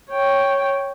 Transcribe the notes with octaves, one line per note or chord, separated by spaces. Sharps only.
C#5 G5